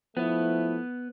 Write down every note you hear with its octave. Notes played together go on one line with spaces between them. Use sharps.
F3 A3 B3 E4